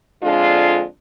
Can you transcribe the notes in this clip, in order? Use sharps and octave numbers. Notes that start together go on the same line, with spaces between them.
F2 D3 G#3 D4 F4